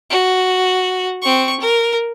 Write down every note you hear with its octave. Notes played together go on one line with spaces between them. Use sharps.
F#4
C4 C#6
A#4